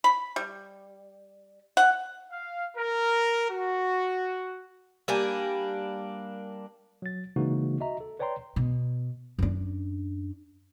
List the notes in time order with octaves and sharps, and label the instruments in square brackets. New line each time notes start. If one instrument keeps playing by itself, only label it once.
[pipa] B5
G3
F#5
[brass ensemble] F5
A#4
F#4
[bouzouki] G3 A#3 D4 G#5
[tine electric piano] F#3 A6
C#3 E3 G#3 A#3 D#4 F#4
F#4 D#5 E5 A#5
A4
B4 C#5 D5 G5 A#5 C6
[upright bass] B2
F#2 D4